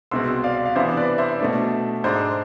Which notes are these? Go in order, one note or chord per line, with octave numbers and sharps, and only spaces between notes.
C2 B2 G#3 C4 C6 E6
D5 F5
F5
C3 E3 B3 D4 C5 E5
B4 D5
C5 E5
B2 A3 D4
G#2 G#3 D4 C5